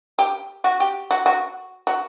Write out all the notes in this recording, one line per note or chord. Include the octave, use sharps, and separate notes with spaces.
G4
F#4
G4
F#4
F#4
F#4